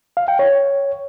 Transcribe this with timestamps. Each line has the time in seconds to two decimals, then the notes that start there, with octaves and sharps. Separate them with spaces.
0.17 F5
0.28 G5
0.39 C#5